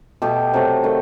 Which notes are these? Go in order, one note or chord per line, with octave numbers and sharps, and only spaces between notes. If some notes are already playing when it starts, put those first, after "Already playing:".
B2 A3 G4
C3 F#3 A3
D#3 A3